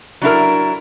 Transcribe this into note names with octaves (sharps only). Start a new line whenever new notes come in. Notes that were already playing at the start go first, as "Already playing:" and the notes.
F#3 D4 E4 A#4